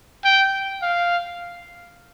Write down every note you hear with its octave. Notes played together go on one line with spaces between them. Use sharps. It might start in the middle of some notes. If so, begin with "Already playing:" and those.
G5
F5